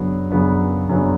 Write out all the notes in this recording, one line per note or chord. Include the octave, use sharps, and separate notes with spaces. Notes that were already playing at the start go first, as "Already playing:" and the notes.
Already playing: F#2 C#3 F#3 B3 D4
F#2 C#3 F#3 B3 D4
F#2 C#3 F#3 B3 D4